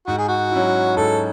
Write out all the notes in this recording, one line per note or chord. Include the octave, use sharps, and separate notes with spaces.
G#2 F#4
G#4
F#4
F#3 C#4 E4
G#2 A4